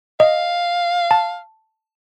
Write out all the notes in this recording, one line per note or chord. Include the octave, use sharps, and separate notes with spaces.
D#5 F5
A5